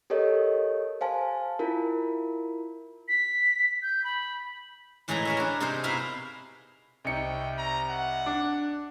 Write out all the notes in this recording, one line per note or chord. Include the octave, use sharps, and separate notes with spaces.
G4 A4 A#4 C#5 D#5
C5 F5 G#5 A5
E4 F4 A#4
B6
G6
B5
A2 E3 G#3 G#4 D#5 A#5
A#4 C#5 E5
D4 A#4
C3 D#4 G#4 A#4 C5
B2 E4 A#4 E5 F5
C2 D#4 G5 C#7
A#5
F#5
D4 D6